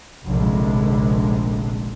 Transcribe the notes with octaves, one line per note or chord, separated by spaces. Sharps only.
F1 A#1 D3 G#3